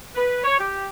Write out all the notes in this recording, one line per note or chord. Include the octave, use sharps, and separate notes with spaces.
B4
C#5
G4